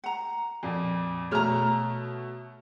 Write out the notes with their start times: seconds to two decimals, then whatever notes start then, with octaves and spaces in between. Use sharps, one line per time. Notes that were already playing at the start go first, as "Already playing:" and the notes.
0.04 F#5 A#5
0.63 F2 A#2
1.31 B2 A3 C#5 A#5 F6